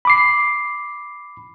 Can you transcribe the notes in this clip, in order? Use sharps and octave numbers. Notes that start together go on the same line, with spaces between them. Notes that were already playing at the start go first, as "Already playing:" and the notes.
B5 D6 C7